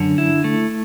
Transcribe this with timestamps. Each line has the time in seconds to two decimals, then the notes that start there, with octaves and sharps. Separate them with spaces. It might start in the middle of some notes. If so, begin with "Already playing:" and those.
Already playing: F#2 D3
0.18 E4
0.44 A3